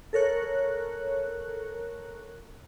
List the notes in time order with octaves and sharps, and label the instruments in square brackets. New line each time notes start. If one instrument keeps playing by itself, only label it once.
[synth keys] A4 A#4 C#5 F#6